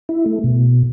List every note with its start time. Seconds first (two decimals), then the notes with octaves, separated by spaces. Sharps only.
0.09 E4
0.26 A3
0.44 B2